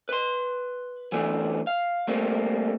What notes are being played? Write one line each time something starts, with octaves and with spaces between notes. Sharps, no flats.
B4 C6
E3 F#3 A3 B3 D4
F5
G3 A3 A#3 C4